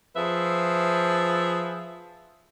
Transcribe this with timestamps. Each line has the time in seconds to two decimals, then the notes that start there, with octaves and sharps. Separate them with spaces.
0.16 F3 G#4 B4 E5